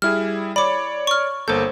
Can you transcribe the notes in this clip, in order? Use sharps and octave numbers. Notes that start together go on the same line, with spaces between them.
G3 E4 G#4 F6
C#5 D5 B5 D6
C#6 F6
G1 A#3 A4 C5 G6